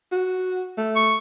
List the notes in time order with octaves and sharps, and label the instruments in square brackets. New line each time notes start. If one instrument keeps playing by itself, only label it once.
[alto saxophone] F#4
A3
[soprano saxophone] C#6